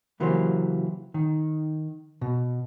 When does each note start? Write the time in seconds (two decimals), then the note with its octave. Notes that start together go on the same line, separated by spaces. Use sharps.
0.20 C#3 E3 F#3 A#3 G4 C5
1.14 D#3
2.21 B2